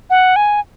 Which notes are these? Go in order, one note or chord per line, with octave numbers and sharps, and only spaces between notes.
F#5
G#5